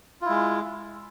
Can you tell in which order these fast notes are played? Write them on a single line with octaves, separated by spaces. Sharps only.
F4 E4 G#3